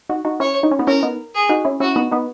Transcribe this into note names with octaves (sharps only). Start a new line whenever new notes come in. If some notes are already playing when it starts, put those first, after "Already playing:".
D#4 F#4
D#4 F#4
C#4 E4 C#5
D#4
C#4
B3 D#4
C#4 E4 A#4
B3 D#4
G#4
D#4 F#4
C#4 E4
C#4 E4 F#4
B3 D#4
B3 D#4